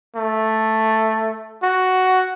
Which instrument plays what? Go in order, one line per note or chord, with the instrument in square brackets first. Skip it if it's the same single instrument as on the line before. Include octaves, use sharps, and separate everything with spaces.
[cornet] A3
F#4